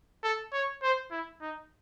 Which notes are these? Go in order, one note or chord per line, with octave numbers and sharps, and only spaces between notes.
A4
C#5
C5
E4
D#4